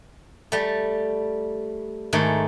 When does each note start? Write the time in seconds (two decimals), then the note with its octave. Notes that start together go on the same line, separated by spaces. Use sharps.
0.52 G3 A3
2.13 G#2 D#3 A3